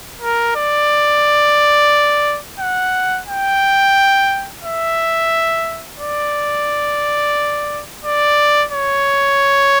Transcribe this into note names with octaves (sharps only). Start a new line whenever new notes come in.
A#4
D5
F#5
G5
E5
D5
D5
C#5